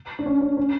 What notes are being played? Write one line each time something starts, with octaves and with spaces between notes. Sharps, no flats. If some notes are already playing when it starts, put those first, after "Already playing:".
D4
C#4
C#4
C#4